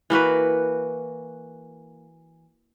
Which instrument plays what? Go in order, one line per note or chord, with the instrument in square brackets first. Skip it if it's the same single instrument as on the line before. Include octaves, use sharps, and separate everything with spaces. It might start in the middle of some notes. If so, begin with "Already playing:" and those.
[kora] E3 A#3 F#4 B4